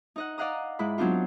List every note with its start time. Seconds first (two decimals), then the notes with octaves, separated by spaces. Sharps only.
0.16 D#4 D#5 F#5
0.38 D5 D#5 F5 F#5 A#5 D#6
0.79 G#2 G#3 E4 B5
0.98 F#3 B3 C4 D4 D#4 F4